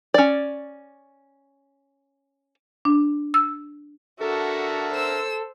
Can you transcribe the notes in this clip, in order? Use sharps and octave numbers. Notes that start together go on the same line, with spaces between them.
C#4 D5
D4
E6
D3 F#4 A4 A#4 E5
C5 E6